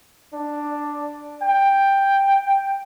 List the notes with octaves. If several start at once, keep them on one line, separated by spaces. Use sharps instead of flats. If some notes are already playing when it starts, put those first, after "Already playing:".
D4
G5